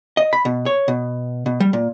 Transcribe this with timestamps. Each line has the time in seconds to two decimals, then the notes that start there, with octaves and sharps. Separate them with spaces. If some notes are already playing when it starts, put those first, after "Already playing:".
0.17 D#5
0.33 B5
0.45 B2
0.66 C#5
0.88 B2
1.46 B2
1.60 G3
1.73 A#2